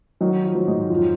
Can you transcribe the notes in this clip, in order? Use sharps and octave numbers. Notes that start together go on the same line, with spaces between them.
D#3 F#3 D#4
F3 F4
F#3
G#2 G#3
F2 F3 F4